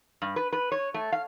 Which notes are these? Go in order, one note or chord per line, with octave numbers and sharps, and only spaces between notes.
G2
B4
B4
C#5
A3
F5